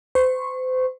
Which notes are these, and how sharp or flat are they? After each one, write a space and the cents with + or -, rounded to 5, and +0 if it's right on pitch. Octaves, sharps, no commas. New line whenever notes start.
C5 -35 C#6 -20